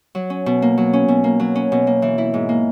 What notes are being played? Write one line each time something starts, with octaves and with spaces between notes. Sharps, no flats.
F#3
C#4
B2
A#3
F#3
C#4
B2
A#3
F#3
C#4
B2
A#3
E3
E4
G#2
A#3